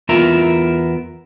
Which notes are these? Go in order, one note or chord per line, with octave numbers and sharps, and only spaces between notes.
E2 B3 F4 A#4 E5 A#5